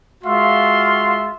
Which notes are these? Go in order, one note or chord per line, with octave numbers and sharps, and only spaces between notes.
G#3 F4 F#4 E5 F5 C6